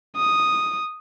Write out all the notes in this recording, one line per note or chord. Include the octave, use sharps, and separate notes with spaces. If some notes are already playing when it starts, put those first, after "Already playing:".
D#6